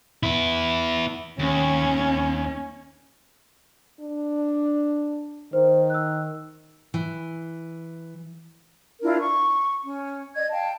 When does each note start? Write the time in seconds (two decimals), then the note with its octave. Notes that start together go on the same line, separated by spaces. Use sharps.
0.23 B3 E4
1.39 D#2 C#4
4.00 D4
5.53 D#3 C5
5.90 E6 F#6
6.94 E3
9.01 D4 E4 F4 A#4
9.20 C#6
9.83 C#4
10.35 D5 D#5 G#6
10.51 F5 G5 A5